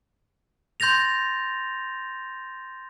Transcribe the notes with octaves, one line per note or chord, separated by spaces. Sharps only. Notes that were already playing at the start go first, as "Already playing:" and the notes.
C6 G6 A6 A#6 F7